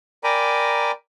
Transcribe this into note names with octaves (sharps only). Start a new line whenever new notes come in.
A#4 D5 G5 G#5 A#5 B5